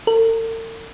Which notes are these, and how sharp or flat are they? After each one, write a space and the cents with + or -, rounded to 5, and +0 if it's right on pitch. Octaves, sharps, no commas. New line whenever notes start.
A4 +45